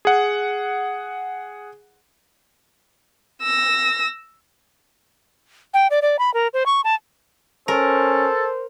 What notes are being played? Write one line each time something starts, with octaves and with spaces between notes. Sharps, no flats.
G#4 F#5
E6 A#6
G5
D5
D5
B5
A#4
C5
C#6
A5
C#4 A4 A#4 C5